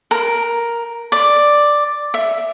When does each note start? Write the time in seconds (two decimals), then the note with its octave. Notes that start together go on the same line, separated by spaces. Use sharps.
0.11 A#4
1.12 D5
2.14 E5